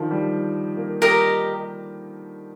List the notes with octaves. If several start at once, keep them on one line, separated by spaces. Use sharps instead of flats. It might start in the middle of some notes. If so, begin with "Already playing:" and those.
Already playing: D3 D#3 F3
G3
A#3
G4 A#4 D#5